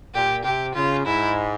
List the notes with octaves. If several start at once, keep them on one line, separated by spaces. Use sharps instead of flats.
A#2 G4
C3 G4
C#3 F4
G#2 E4